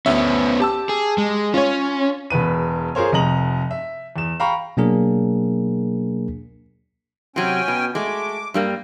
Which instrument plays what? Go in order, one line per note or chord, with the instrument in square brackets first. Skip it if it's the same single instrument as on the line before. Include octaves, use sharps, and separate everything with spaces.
[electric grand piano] D2 E5 [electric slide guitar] B3 C#4
[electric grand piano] G4 A5 E6
[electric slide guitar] G#4
G#3
[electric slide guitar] C#4 [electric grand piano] F4 C#5
[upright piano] E1 E2 B4 D#7
F4 G#4 A#4 C5 C#5
F1 F2 D#5 A#5 F#7
E5
E2 E7
F5 G5 A#5 B5 C#6
[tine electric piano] B2 F#3 A#3 D4 G#4 A#4
[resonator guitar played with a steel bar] C3 F#3 [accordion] C#4 G5 G#5
[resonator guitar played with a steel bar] B2
[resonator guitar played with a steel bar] G#3 A3 [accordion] D6
[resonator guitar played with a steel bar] G2 G3 A#3